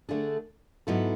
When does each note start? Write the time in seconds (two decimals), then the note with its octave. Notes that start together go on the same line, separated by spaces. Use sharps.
0.09 D3 A3 D4 G#4
0.87 G#2 F#3 B3 E4 A4